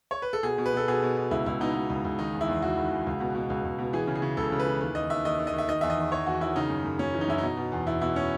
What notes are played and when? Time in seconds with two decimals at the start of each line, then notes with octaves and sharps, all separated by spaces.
0.11 C#5
0.22 B4
0.33 A4
0.43 B2 G#4
0.58 B2
0.66 B4
0.74 B2 A4
0.88 B2 G#4
1.03 B2
1.17 B2
1.31 C#2 E4
1.46 C#2 E4
1.61 B2 D#4
1.75 B2
1.90 C#2
2.05 C#2
2.19 D#3 D#4
2.33 E2
2.41 E4
2.48 E2
2.62 E2 F#4
2.78 D#3
2.91 E2
3.07 C#2
3.20 B2
3.35 B2
3.50 C#2
3.65 C#2
3.79 B2
3.93 E3 G#4
4.07 C#3
4.15 G#4
4.22 C#3
4.37 C#2 A4
4.52 C#3
4.59 B4
4.66 E3
4.80 D#2 B4
4.95 D#2 D#5
5.10 D#2 E5
5.25 D#2 D#5
5.39 D#2
5.47 D#5
5.53 D#2
5.58 E5
5.68 D#3 D#5
5.81 E2 E5
5.90 D#5
5.98 D#3
6.12 E2 C#5
6.27 E2 F#4
6.41 D#3 E4
6.56 C#3 D#4
6.70 F#2
6.85 F#2
6.99 F#2 C#4
7.14 E3
7.21 D#4
7.28 F#2 E4
7.38 B2 D#4
7.57 B2
7.72 E2
7.86 E2 E4
8.01 B2 E4
8.16 C#4